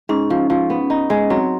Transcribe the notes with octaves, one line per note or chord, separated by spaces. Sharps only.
G#2 C#4
F3
F3
B3
D#4
G#3
F#3 C4